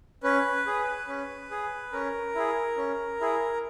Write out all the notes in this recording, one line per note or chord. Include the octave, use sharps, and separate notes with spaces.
C#4 B4
G#4
C#4
G#4
C#4 A#4
E4 G#4
C#4
E4 G#4